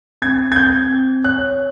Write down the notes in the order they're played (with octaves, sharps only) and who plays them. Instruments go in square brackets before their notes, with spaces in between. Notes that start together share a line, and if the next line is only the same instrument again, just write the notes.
[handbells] C4 [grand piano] G#6
[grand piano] G#6
[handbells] C4 [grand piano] G6
[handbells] C4
[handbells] C#5 [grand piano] F#6